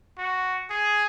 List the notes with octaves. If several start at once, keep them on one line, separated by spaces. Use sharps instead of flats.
F#4
G#4